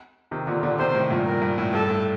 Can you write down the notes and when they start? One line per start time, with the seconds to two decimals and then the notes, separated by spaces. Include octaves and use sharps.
0.31 C3 D#3
0.47 A#2 D3
0.63 A#2 D3
0.79 C3 D#3 C5
0.95 A2 C3
1.10 G2 A#2
1.26 A#4
1.42 G2
1.58 A2
1.73 G2 A4
1.89 A2